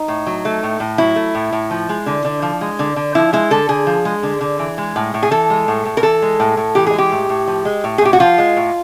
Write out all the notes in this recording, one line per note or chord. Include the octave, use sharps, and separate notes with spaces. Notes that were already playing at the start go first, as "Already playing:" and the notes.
Already playing: D#4
A2
F#3
A3
A2
A2
F#3 E4
A3
A2
A2
F3
G#3
D3
D3
F3
G#3
D3
D3
F3 E4
G#3 E4
D3 A4
D3 G#4
F3
G#3
D3
D3
E3
G#3
A2
A2
G#4
E3 A4
G#3
A2
A2
A#4
E3 A4
G#3
A2
A2
E3 G4
G#4
G#3 G4
A2
A2
F3
G#3
A2
G#4
A2 G4
F#4
F3 F4
G#3
A2